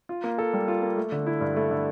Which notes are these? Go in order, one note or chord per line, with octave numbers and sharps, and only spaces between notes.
F4
A#3
A4
G3
F4
A#3
A3
D3
E4
G2
A3
D3